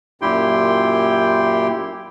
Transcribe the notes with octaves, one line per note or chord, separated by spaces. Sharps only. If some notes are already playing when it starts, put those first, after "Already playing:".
F#2 A#2 E4 G4 G5 C6